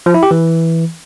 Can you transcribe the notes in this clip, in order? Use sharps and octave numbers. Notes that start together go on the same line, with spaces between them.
F3
E4
G4
E3